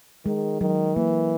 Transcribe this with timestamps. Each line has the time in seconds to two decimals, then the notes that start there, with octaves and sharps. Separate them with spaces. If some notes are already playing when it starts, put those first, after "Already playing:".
0.25 D#3 G#3
0.61 D#3 F#3
0.96 E3 A#3